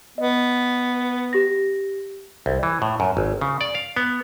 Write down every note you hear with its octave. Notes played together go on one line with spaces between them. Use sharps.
B3 D#5
G4 A#6
C2
E3
A2
F#2
G#1
C#3
D5
F5
B3